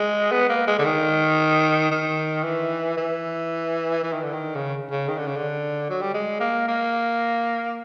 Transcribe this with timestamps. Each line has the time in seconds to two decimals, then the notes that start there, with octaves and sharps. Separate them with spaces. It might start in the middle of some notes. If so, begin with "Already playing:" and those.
Already playing: G#3
0.32 B3
0.49 A#3
0.67 G#3
0.78 D3
0.85 D#3
1.91 D#3
2.44 E3
2.97 E3
4.03 E3
4.13 D#3
4.23 D3
4.33 D#3
4.55 C#3
4.91 C#3
5.08 D#3
5.18 D3
5.28 C#3
5.36 D3
5.90 F#3
6.02 G3
6.14 G#3
6.40 A#3
6.68 A#3